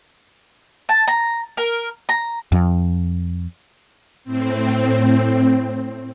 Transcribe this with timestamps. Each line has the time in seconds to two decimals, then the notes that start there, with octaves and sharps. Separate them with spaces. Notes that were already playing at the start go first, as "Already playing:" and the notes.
0.89 A5
1.07 A#5
1.57 A#4
2.09 A#5
2.52 F2
4.24 A2 C4